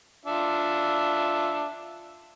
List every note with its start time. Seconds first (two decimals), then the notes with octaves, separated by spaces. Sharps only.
0.25 D4 F4 E5